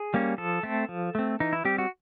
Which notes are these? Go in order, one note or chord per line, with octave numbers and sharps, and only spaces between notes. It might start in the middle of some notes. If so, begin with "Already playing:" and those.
Already playing: G#4
G3 A#3 C#4
F3 A4
A3 C4
F3
A3 C4
E3 D#4
E4
G3 C4 G4
F#4